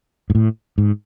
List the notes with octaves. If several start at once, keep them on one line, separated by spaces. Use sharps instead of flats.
G#2
A2
G#2